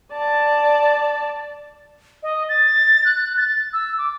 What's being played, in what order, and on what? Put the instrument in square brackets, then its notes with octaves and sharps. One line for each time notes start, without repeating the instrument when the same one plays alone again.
[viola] D5 A5
[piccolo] D#5
A6
F#6
A6
E6
D6